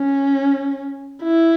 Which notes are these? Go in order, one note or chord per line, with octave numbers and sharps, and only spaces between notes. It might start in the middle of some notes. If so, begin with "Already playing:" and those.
Already playing: C#4
E4